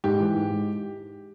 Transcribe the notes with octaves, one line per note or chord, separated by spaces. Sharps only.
G#2 G4
E3
G#2
G#2